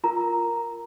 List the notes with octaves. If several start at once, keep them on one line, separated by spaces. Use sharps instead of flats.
F4 A#4 A#5